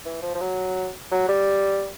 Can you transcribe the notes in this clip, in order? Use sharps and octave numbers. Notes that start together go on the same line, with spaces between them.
E3
F3
F3
F#3
F#3
G3